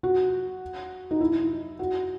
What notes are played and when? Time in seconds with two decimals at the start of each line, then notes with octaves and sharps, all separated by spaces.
0.03 F#4
1.11 D#4
1.21 E4
1.79 F#4